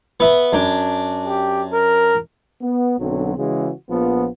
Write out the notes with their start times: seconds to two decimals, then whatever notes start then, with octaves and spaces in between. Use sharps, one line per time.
0.20 B3 E5 B5
0.53 F#2 D4
1.27 G4
1.73 A#4
2.61 B3
2.99 B1 D3 F#3 C4
3.38 C#3 E3 G#3 F#4
3.89 A#1 F3 B3